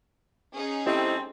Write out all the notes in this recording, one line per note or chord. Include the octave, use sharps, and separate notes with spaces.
C#4 D#4 G#4
G3 A3 C4 E4 G4 D#5